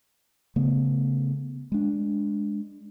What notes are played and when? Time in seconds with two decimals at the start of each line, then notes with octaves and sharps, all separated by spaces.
0.56 C#3 A3 B3
1.72 G#3 D4